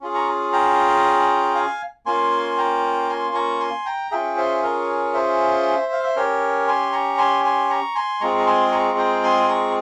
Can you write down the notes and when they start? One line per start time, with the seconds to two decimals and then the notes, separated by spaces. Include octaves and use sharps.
0.01 C#4 F4 G#4
0.14 A#5 C#6
0.53 G5 A#5
1.55 F5 G#5
2.06 A#3 C#4 F4 G#5 C6
2.57 G5 A#5
3.09 G#5 C6
3.35 A#5 C#6
3.60 G#5 C6
3.85 G5 A#5
4.11 C#4 F4 G#4 E5 G5
4.36 C5 E5
4.63 A#4 C#5
5.14 C5 E5
5.92 F5
6.03 E5
6.16 C#4 G4 A#4 C#5
6.68 G#5 C6
6.92 A#5 C#6
7.18 G#5 C6
7.44 G#5 C6
7.69 A#5 C#6
7.95 G#5 C6
8.21 G#3 C4 F4 G#4 A#5 C#6
8.38 A#5
8.47 G#5 C6
8.72 A#5 C#6
8.97 G5 A#5
9.23 G#5 C6
9.48 A#5 C#6